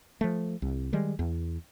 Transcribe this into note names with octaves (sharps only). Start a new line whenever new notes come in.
F3 A3
C2
D#3 G3 G#3
E2